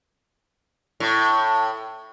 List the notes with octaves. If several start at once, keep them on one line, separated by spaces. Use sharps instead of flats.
A2